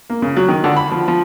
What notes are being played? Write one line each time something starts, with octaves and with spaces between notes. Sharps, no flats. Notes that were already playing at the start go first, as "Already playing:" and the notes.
A#3
C#3
F#3
D#3
D3
B5
F3
F3